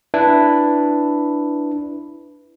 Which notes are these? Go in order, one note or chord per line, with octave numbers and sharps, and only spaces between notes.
D4 E4 B4